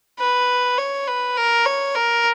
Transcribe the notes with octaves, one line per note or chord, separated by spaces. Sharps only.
B4
C#5
B4
A#4
C#5
A#4